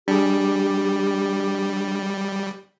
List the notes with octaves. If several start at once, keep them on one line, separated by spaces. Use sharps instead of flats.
G3 D4 G4 G#4